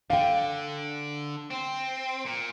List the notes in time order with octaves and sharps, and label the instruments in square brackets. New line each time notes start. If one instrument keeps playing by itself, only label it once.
[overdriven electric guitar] D3 [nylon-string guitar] F5 G5
[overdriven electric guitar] C4
A#2